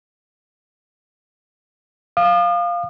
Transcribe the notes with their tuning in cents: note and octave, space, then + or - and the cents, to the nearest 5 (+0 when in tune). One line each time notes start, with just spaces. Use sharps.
F5 +0 D#6 -45